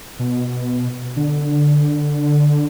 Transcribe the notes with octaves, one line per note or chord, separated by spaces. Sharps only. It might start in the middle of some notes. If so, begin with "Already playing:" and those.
B2
D3